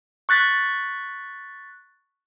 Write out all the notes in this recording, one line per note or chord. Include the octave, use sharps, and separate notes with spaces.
C#6 F#6 A6 B6